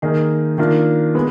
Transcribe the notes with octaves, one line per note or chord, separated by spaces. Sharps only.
D#3 A#3 D#4 G#4
D#3 A#3 D4 F4
G#3 B3